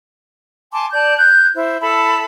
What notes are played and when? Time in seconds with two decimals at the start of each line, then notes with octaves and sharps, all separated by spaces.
0.73 G#5 A5 C6 D6
0.93 D5 A5 G6
1.17 F#6 G6
1.54 E4 C5
1.81 E4 A4 A5 B5